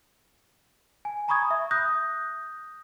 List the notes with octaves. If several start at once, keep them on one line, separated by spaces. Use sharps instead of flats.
G#5
G#5 A#5 B5 C#6 D#6 G#6
E5
D#6 F#6 G6 A#6